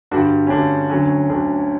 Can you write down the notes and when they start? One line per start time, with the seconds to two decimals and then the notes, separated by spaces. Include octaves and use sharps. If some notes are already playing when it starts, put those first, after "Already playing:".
0.11 G2 D3 G3 D4 F#4
0.47 C#4
0.50 G2 D3 G3 D4
0.89 D2 D3 F#3 C#4
1.29 D2 D3 F#3 D4